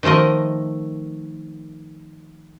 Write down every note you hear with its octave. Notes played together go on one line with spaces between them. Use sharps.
D#3 F3 A3 A#4 D#5